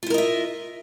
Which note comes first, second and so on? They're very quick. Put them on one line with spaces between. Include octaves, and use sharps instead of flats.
F4 E4 A#4 D#5 E5